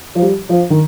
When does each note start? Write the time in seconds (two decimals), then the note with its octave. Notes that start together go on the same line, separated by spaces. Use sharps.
0.15 F3
0.22 G3
0.49 F3
0.70 D#3